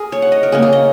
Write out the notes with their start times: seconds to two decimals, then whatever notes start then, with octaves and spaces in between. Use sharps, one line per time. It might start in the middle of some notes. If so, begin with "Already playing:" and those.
Already playing: G#4 A#4
0.12 C#5
0.22 F#5
0.32 D#5
0.43 A#4
0.52 C#3 A#3 C#4 G#4
0.62 G#4
0.73 D#5